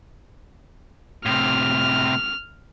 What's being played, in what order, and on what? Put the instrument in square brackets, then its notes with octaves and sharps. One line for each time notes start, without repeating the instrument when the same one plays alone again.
[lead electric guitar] A2 C3 [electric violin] F6